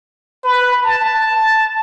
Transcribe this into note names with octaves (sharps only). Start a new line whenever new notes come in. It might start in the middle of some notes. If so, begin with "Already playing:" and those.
B4
A5